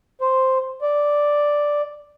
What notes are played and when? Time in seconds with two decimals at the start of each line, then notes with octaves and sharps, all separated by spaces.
0.21 C5
0.82 D5